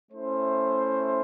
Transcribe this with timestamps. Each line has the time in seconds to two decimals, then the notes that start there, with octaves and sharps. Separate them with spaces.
0.11 A3 C#4 E4 C5